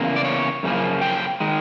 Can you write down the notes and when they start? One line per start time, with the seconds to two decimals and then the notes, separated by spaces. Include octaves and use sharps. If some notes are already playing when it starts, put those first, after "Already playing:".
Already playing: E2 C#3 A#3
0.16 D5
0.25 C#5
0.63 F#2 C#3 F3 A#3
1.02 G5
1.40 D#3 G#3